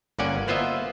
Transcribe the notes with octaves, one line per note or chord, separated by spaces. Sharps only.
G1 A#3 C#4 D5 F#5 G#5
A#3 B3 F4 C5 D#5 E5